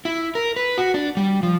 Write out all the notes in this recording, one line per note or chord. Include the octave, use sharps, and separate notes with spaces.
E4
A#4
B4
F#4
D4
G3
F3